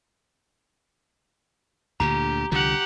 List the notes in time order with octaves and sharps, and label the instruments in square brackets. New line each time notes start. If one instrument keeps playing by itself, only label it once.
[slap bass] D2 A#2 D3 [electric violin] G4 [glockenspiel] A#5
[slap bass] C2 D3 F3 [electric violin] G4 F#5